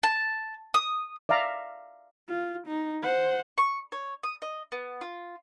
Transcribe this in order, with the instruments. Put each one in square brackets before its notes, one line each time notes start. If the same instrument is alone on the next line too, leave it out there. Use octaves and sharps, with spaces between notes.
[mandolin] A5
D#6
[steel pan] D5 E5 F5 A#5
[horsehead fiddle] F4
D#4
C5 F#5
[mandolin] C#6
C#5
D#6
D#5
B3
F4